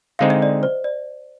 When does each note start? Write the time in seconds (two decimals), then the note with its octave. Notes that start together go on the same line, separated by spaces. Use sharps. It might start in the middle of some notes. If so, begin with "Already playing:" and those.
0.19 D3 G#3 C4 D#4 F5
0.30 D#5
0.42 D5
0.63 C5
0.84 D5